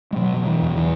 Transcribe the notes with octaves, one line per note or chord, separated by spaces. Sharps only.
G#3
B2 F#3
F#3
E3
E2
E3